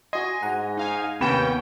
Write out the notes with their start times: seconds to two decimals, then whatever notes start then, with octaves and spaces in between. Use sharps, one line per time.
0.13 F#4 D#5 G#5 C6
0.43 G#2 F#5 A#5
0.77 D#4 F5 G#5
1.21 D#2 C3 B3 C#4 G5 B5 E7